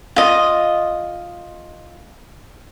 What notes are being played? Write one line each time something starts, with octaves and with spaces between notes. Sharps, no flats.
F4 D#5